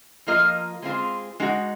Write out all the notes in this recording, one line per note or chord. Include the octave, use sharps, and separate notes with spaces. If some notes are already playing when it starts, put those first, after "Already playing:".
F3 A#3 F4 A#4 D#5
G#3 C4 F4 G#4 C5
G#3 D#4 F#4